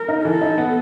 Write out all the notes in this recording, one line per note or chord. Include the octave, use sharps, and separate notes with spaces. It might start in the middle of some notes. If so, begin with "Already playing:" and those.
Already playing: A#4
D#4
E3 A4
D#4
B3